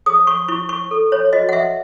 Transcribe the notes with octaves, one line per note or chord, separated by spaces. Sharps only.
G#4 D#6
C#6
E4 C#6
C#6
A4
C#5
F#4 D#5
F#5
E5